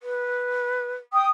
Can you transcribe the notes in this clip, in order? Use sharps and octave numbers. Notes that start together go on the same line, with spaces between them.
B4
G5 D#6